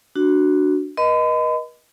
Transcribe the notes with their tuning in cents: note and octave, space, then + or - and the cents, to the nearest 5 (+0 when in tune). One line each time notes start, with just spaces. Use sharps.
D4 +5 F#4 +0
B4 -40 D#5 +0 B5 +45